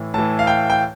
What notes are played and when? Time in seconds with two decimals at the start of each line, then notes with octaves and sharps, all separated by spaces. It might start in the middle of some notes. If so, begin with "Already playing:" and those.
Already playing: A2 E3
0.14 A2 E3 A5
0.39 F5
0.47 G5
0.70 G5